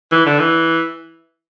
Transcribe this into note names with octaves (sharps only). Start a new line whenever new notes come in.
E3
D3
E3